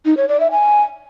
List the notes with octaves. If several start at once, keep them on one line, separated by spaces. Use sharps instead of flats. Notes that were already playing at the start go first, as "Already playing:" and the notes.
D#4
C#5
D5
E5
G#5